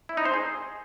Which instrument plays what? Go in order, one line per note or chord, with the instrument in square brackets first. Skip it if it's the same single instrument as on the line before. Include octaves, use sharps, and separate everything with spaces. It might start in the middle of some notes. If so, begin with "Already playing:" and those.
[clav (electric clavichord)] E4
D#4
C5
G#4